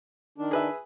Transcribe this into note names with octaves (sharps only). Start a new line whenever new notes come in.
D#3 D4
G#4 B4 E5